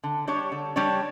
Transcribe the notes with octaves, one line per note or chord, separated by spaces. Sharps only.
D3
G3 D4 G4 C#5
D3
G3 D4 G4 C#5